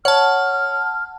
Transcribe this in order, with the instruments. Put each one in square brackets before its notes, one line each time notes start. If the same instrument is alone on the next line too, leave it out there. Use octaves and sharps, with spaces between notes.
[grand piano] C#5 [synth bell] F#5 A5 [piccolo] F6